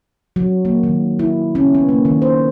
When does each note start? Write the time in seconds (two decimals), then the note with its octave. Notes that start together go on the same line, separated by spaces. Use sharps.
0.36 F#3
0.65 A#3
0.83 D#3
1.19 E4
1.55 C#4
1.75 B3
1.89 A#3
2.05 D#3
2.22 C5